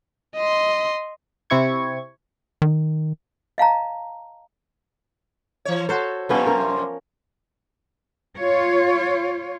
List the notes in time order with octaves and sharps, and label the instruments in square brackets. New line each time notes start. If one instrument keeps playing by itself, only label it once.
[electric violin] D#5 C6
[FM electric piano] C3 C4 E4 C#6 G#6
[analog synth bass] D#3
[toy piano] D#5 F5 A5 A#5
[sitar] E3 C#5
[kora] F#4 C5 C#5 [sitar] A4
[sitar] F#2 C3 G3 [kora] F3 B3 C#4
[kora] A#4
[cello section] F4 C#5